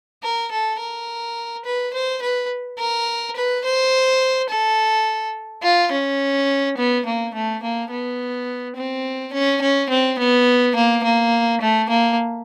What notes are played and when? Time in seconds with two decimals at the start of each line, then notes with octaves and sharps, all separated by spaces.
0.23 A#4
0.52 A4
0.79 A#4
1.65 B4
1.93 C5
2.22 B4
2.78 A#4
3.36 B4
3.64 C5
4.49 A4
5.63 F4
5.92 C#4
6.77 B3
7.05 A#3
7.34 A3
7.62 A#3
7.91 B3
8.76 C4
9.33 C#4
9.61 C#4
9.90 C4
10.19 B3
10.75 A#3
11.04 A#3
11.61 A3
11.89 A#3